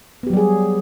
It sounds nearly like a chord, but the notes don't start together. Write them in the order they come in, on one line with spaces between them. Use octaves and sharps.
B3 G4 F#3 G3 G#4